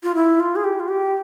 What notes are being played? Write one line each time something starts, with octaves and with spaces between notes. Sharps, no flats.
F4
E4
F4
G#4
G4
F4
G4